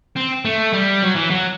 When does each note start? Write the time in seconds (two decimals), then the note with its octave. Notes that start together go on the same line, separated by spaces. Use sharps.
0.17 C4
0.45 A3
0.73 G3
1.02 F#3
1.15 E3
1.30 F#3